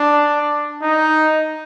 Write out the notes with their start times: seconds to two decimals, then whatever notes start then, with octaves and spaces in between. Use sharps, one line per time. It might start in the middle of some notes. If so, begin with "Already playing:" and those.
Already playing: D4
0.82 D#4